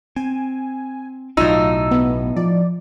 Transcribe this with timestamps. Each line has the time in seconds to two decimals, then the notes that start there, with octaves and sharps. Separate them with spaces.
0.16 C4 G#5
1.37 B1 A2 F#3 D#4 F4 E6
1.91 B3
2.36 F3 D5